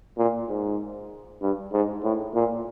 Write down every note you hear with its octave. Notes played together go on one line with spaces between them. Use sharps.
A#2
G#2
G2
G#2
A2
A#2